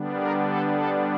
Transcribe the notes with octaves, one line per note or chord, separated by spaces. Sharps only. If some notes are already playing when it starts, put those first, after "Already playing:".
Already playing: D3 G3 B3 D4
A#4
A4
A4